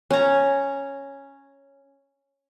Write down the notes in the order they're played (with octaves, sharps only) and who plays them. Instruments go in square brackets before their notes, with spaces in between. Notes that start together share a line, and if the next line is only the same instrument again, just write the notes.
[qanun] C#4 A#5